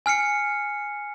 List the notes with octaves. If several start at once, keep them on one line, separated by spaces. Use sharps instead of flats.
G#5 F6 C7 C#7